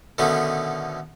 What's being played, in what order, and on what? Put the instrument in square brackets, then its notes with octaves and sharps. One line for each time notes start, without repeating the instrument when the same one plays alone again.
[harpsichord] B2 D3 D#3 A3 C#4